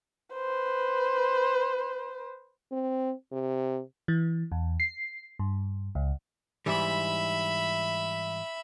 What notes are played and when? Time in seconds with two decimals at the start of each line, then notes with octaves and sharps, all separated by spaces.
0.34 B4 C5
2.72 C4
3.32 C3
4.08 E3
4.52 E2
4.80 C7
5.39 G2
5.95 C#2
6.66 G#2 E3 G3 E5 B5